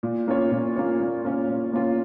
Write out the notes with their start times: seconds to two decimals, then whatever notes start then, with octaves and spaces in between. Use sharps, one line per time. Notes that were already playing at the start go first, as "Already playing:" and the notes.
0.03 A#2
0.27 A#3 C#4 F4 C#5
0.52 A#2
0.76 A#3 C#4 F4 C#5
1.01 A#2
1.25 A#3 C#4 F4 C#5
1.49 A#2
1.73 A#3 C#4 F4 C#5